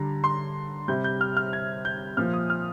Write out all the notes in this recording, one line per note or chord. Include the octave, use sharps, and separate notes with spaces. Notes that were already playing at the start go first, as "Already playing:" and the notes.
Already playing: D3 G3 A#5
C6
C3 G3 G6
G6
F6
F6
G#6
G6
A#2 F3 F6
D#6
F6